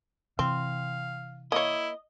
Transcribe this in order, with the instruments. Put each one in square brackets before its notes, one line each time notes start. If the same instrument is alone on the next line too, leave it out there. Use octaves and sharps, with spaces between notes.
[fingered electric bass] C3 E3 [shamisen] C4 [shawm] F5
[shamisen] A#3 C#5 [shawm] E4 [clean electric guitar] D#5